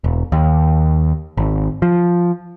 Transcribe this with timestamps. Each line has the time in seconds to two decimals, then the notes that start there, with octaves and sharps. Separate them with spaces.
0.04 E1
0.32 D#2
1.37 G#1
1.82 F3